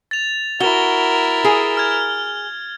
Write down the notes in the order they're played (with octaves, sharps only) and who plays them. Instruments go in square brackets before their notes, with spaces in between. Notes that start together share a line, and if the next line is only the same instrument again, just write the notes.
[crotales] A6 F7
[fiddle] E4 A#4 [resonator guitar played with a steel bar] F#4 [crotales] G7
[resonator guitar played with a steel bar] G#4
[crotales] F6 G#6